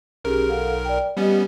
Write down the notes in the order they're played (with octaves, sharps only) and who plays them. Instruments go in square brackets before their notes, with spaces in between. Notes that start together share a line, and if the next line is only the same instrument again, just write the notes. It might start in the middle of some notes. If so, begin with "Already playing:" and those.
[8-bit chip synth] B1 A#4 [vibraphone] C#4 G4 G#4
[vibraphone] A4 F5 F#5
D5 G5
[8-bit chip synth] G3 B3 C#4 [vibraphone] G4 D#5